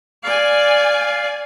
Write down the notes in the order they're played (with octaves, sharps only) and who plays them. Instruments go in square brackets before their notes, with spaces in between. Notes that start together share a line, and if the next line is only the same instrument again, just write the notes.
[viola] D5 G#5 [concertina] F5